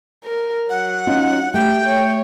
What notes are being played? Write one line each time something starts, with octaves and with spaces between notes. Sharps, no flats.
A#4
F#3 F#5
C#4 D#4 F4
A3 G4 G5
C#5